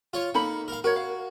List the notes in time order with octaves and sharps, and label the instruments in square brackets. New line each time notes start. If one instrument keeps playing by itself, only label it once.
[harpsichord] F4 C#5
[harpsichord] A#3 [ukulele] D#4 A4 B5
[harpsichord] A#4 F5
[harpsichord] F#4 [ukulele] A#4 C#5
[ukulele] F5